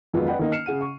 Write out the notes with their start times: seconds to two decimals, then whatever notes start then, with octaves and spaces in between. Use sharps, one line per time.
0.13 F2 D#3 F#3 G#3 B3 F4
0.27 B4 D5 D#5 F#5 G5 B5
0.39 D#3 A#3 D#4
0.52 F6 C7 C#7 E7
0.66 C#3 G#4 F#5 D#7
0.81 C#6